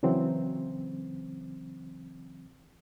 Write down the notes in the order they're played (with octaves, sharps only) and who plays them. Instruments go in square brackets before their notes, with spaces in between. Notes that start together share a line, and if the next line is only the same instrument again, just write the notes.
[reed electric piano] C#3 E3 F#3 C4